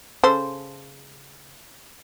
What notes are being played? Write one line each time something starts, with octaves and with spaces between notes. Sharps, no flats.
C#3 A4 C5